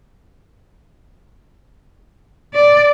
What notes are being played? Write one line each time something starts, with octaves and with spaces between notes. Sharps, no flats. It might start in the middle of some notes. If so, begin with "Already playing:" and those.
D5